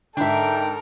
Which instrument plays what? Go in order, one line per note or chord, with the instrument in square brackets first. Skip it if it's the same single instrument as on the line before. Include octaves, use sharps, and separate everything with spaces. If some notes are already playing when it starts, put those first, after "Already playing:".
[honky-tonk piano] G#2 D3 [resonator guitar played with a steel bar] D4 E5 [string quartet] A4 A#4 [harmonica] G5